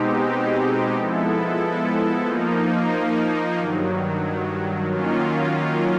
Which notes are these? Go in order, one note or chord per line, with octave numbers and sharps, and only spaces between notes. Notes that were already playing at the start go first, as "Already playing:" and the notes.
Already playing: B2 G#3 C4 D#4 G4
F3 G#3 B3 E4 A4
F3 A#3 D#4
G2 D#3 F#3
D#3 F#3 A#3 C#4 F4